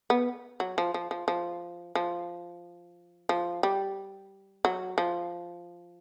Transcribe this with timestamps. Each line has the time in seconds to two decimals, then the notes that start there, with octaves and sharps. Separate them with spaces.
0.10 B3
0.60 F#3
0.78 F3
0.94 F3
1.11 F3
1.28 F3
1.95 F3
3.29 F3
3.63 G3
4.65 F#3
4.98 F3